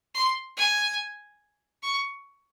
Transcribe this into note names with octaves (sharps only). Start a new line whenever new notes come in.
C6
G#5
C#6